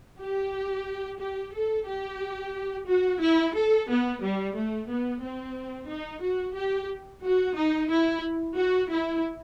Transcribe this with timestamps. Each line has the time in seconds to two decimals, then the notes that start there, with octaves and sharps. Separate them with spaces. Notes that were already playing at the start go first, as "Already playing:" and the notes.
0.20 G4
1.20 G4
1.53 A4
1.87 G4
2.87 F#4
3.21 E4
3.55 A4
3.89 B3
4.21 G3
4.55 A3
4.89 B3
5.22 C4
5.88 D#4
6.22 F#4
6.55 G4
7.23 F#4
7.56 D#4
7.90 E4
8.56 F#4
8.90 E4